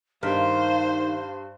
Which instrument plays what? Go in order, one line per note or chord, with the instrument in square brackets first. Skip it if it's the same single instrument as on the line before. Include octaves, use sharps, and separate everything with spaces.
[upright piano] G2 F6 B6 [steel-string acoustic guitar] D#3 [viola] C5 [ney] F5